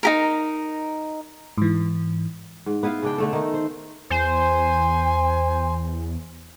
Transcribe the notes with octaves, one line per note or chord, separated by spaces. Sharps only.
D#4 G4 A#4
G#2 E3
G#2
B3 E4 B4 F5
C#3 D4 G5
D3 A3 A4
D#3 D#4
C5
E2 C5 G#5